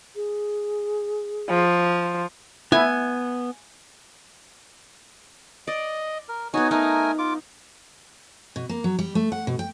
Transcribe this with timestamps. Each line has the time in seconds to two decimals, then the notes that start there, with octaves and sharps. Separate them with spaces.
0.16 G#4
1.50 F3
2.72 B3 E4 G#5
5.67 D5 D#5
6.29 A#4
6.54 B3 D#4 F#4 C#5 G#5
6.71 A3 D#4 A#4 G#5
7.19 F4 D6
8.56 B2
8.69 A#3
8.84 F#3
8.99 G3
9.15 A3
9.32 F#5
9.47 B2
9.59 G5